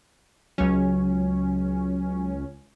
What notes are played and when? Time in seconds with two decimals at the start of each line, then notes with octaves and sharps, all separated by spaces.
0.58 C#2 F#3 C#4